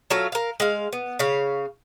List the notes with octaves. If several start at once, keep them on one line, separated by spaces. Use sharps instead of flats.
F#3 A3 F4 F5
A#4 F5
G#3 F5
B3
C#3 F5